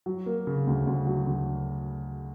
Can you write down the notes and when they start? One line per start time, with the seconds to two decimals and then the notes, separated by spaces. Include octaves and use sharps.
0.06 F#3
0.26 A#3
0.47 C#3
0.67 D2
0.87 D2
1.07 F#3
1.27 D2